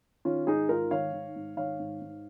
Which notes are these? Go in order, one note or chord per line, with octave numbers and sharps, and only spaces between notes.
D#3 C#4 F4
G#2 D#4 G#4
G#2 F4 A#4
D#3 C#5 F5
D#3
G#2
D#3 C#5 F5
G#2
G#2